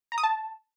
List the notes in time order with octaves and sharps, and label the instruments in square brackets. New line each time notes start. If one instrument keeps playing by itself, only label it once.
[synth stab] A#5
D#6
A5